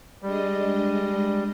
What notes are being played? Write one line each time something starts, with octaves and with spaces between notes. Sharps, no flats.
G3 G#3 D4 D#5